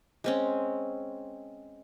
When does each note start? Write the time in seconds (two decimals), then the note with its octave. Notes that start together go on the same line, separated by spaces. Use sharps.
0.24 G#3 C4 C#4